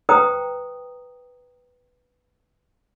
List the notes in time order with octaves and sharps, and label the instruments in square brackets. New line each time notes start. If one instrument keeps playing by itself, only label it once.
[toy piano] B4 C5 G5 A#5 D#6